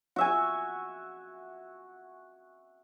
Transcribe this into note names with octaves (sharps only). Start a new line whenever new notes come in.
F#4 E5 G#5